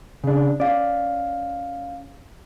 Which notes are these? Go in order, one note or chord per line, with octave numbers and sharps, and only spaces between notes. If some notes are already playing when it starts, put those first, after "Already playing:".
C#3 D4
C#4 D5 F5